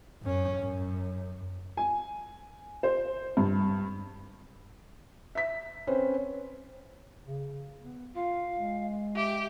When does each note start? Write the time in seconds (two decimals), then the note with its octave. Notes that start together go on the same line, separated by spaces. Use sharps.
0.22 F#2 C#4
0.59 F#2
1.77 G#5
2.83 C5
3.37 G2
5.35 E5 B6
5.87 C4 C#4 B4 C5
7.27 C#3
7.82 B3
8.15 F4 F5
8.56 G#3
9.16 G4 E5